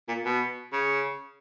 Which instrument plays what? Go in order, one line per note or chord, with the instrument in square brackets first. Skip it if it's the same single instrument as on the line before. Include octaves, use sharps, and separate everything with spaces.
[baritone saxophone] A#2
B2
C#3